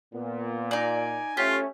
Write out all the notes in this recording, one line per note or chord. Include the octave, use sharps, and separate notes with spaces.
A#2 B3
D#4 D5 G#5
A3 C#4 F4 G4 C#5